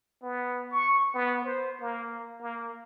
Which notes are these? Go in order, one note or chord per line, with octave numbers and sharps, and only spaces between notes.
B3
C#6
B3
C5
A#3
A#3